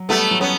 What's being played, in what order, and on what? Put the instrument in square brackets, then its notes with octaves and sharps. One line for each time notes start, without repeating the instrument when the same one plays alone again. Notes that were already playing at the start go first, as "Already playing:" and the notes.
Already playing: [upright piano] F#3
[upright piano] G3 [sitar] A3 B3
[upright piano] F#3
[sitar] B3 C#4